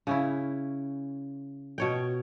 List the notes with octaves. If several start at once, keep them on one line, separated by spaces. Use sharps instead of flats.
C#3 C#4 E4
B2 C#5 G5